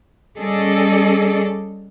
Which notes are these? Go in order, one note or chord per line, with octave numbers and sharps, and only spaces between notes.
G3 C#4 G#4 A4 D5 D#5